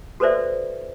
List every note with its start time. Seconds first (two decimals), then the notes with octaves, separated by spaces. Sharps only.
0.20 F#4 A4 B4 C5 D5 E5